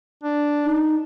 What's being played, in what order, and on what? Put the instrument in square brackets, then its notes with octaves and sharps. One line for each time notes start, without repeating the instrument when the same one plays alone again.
[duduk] D4
[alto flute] D#4